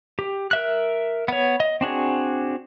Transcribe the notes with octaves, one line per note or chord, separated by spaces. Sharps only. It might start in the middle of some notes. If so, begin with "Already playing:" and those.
G4
A#4 E5 F#6
B3 C#5
D#5
C4 D4 F#4 G#4